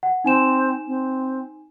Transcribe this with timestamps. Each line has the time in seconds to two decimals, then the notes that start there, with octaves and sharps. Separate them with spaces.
0.03 F#5
0.24 C4 D#4 G#5 E7
0.87 C4